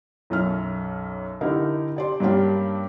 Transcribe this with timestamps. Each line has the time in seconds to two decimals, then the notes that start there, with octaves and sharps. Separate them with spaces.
0.30 B1 F#2 F6
1.41 D3 D#4 E4 G4 A#4
1.96 G4 D5 C6
2.20 G2 A#3 C#4 D4 G4